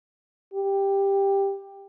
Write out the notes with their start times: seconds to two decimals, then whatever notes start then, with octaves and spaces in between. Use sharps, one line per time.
0.54 G4